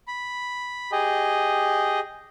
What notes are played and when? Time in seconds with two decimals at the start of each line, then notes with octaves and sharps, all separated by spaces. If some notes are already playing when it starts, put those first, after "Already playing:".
0.08 B5
0.92 G4 G#4 D#5